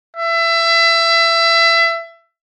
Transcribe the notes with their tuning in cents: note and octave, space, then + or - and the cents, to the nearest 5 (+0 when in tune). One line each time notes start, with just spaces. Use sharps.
E5 +25